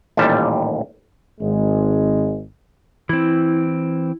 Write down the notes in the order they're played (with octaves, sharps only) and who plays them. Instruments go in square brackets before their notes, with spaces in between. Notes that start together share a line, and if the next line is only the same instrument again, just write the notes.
[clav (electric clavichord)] A1 D#2 A#2 G3 A5
[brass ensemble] G#1 G#3
[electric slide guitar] E3 C4 [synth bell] E4